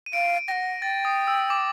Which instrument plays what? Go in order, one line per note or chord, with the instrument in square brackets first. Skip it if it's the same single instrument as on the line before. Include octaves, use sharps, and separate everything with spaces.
[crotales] D#7
[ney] F5 [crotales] D7
[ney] F#5 G5 [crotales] A#6
[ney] G5 [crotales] A6
[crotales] D#6
E6
D6